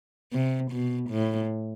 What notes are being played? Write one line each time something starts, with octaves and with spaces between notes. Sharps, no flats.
C3
B2
A2